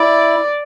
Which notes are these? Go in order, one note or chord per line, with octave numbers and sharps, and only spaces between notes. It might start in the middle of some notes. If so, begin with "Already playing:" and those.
Already playing: E4 D5